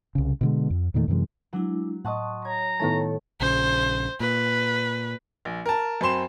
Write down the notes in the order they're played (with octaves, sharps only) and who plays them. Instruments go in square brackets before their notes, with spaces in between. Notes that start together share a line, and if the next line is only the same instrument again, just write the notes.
[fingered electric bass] C2 C#3
B2 D3 G#3
F2
E2 A#2 D#3 A3
F#2 C3 E3 G#3
[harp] F#3 [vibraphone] G#3 D4 E4
[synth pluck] A2 D#5 [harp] F#5 A5 D#6 [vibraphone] C6 C#6
[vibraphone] C#5 [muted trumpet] A#5 [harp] G#6
[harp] A2 D#3 A3 [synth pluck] B3 E4 A5 [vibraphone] A4 C#5
[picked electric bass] A#1 C#3 [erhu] C5
[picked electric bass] A#2 [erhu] B4
[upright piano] A#1
A#4 A5
F#2 C4 B5 C6 E7